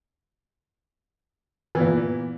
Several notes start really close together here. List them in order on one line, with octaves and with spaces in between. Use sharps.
E3 B3 A#2